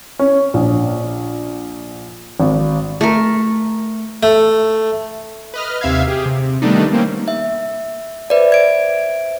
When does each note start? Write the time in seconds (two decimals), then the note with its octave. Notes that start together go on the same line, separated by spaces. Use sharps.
0.19 C#4
0.54 A#1
2.40 G#1
3.01 A3 A#4
4.23 A3
5.54 B4 D#5 F6
5.81 D#2 C3 E5 F5 G#6
6.08 G4 G#4
6.26 C3
6.62 D#3 G3 A3 B3 D4 D#4
6.92 G3 A#3 C4 C#4
7.28 E5
8.30 B4 C5 D5 E5
8.52 G#6 D7